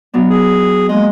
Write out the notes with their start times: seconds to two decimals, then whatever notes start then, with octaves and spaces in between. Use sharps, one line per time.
0.14 F#3 B3 D4
0.30 G#4
0.89 G#3 A#3 D#5